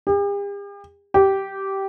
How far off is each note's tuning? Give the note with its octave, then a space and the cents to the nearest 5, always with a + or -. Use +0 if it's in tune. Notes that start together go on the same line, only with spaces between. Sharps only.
G4 +45
G4 -15